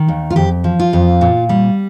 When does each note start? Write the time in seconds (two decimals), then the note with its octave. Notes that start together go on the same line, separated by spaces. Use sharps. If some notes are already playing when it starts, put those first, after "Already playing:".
Already playing: D#3
0.08 D#2
0.30 F4
0.36 F2 G4
0.64 F3
0.79 F4
0.93 F2
1.21 A#2
1.49 G3